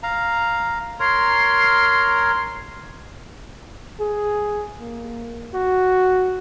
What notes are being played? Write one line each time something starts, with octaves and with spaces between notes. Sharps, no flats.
F5 A#5
A#4 C#5 A#5 C6
G#4
A#3
F#4